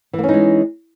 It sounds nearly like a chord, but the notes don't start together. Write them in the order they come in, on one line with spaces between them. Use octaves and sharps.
E3 A#3 C#4 D#4 G#3